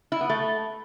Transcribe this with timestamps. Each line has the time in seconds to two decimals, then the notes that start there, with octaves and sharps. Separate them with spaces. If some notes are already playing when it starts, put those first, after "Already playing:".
0.12 E4
0.21 B3
0.30 A3